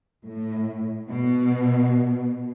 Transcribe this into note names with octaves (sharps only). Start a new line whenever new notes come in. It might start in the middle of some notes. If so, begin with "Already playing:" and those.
A2
B2